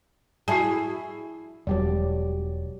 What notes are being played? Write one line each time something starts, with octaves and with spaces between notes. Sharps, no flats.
E4 F#4 G#4 A5
E1 F#3 G3 D5